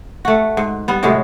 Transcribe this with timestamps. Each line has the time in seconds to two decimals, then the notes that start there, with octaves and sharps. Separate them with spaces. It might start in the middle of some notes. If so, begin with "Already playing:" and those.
0.25 A3 F#4
0.57 G#2
0.88 G3 B3
1.03 A2 C3 F#3 G#3